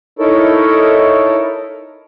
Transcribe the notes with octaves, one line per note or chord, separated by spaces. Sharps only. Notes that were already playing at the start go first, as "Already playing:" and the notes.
D#4 E4 A4 A#4 C#5